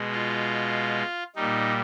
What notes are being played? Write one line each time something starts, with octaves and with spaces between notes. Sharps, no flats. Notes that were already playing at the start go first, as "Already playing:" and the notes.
Already playing: B2 G#3
F4
A#2 G3 D#4